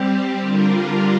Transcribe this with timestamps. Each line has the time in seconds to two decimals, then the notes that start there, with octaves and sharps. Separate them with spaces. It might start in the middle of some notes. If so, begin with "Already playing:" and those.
Already playing: G3 C4 G4
0.40 D3 G3 D4 F4 A#4